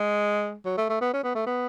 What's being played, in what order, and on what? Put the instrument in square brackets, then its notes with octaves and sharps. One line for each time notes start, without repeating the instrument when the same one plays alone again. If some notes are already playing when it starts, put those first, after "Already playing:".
Already playing: [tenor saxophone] G#3
F#3
A3
A3
B3
C#4
B3
A3
B3